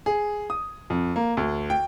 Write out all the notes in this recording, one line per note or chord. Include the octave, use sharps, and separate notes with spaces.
G#4
D#6
F2
A#3
D2
G5